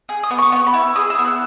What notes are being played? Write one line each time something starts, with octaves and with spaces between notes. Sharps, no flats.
G#4
D#6
B3
C#6
B3 C#6
B5
E4
G#4 D#6
E6
B3
F#6